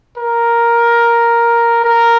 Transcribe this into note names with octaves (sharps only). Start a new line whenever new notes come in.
A#4
A#4